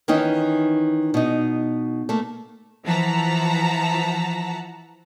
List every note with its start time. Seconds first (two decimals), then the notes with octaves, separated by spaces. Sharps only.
0.08 D#3 E3 C#4 D#4
1.14 B2 D#4
2.09 A3 A#3
2.85 E3 F3 F#5 A5 A#5 B6